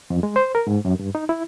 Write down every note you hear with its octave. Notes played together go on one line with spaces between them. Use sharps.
F2
G#3
C5
A#4
G#2
F#2
G2
D#4
E4